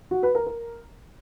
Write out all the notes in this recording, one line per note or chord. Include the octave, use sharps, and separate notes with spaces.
F#4
B4
A#4
A#4